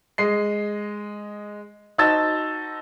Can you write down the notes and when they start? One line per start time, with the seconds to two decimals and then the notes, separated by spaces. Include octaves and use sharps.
0.18 G#3 D#5 C7
1.98 D#4 F#4 C5 A5 E6 A6